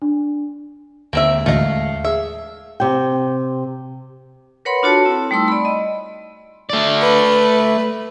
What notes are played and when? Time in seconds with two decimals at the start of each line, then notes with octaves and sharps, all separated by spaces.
0.02 D4
1.13 D#2 D3 G#3 A#3 C4 E5
1.46 A1 D2 A3 D#5 F5
2.04 G#4 E5
2.80 C3 G5
4.65 A#4 B4 C#5 F#5 B5 C6
4.83 D4 F4 F#4 A4 C#5 A5
5.05 C4 E4
5.31 G3 A3 D#4 C6 E6
5.48 D5 B5
5.65 D#5
6.70 A3 D5
7.01 B4